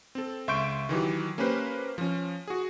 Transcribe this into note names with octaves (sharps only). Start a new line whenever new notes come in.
C4 A4
C#2 E5 C6 C#6 G6 D7
D#3 E3 F#3 G4
A#3 C#4 G4 B4 C5
F3 C#4
F#4 G#4